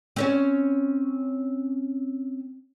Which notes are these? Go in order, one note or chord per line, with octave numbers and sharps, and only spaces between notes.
C4 C#4 C#5